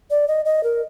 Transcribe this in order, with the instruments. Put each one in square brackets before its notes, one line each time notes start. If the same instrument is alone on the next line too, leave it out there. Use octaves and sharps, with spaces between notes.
[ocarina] D5
D#5
D#5
A#4